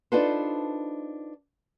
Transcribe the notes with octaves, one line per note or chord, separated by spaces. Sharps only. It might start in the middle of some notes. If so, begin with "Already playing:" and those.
D4 D#4 F4 A4 B4 C5